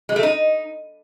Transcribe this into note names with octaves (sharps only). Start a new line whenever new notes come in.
G#3
A3
D#4